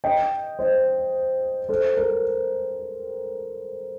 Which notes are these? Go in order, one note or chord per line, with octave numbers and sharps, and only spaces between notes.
D#5 G5
C5 D#5
A4 C5
A#4